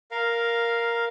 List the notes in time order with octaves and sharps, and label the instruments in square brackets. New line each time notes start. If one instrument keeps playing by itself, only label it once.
[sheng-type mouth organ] A#4 F5